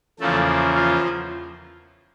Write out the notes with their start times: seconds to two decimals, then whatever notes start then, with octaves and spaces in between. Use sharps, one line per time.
0.20 E2 C#3 F3 A3 A#3 A4
0.75 F3 F4